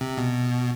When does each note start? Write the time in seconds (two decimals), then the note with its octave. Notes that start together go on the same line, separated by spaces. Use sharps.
0.01 C3
0.17 B2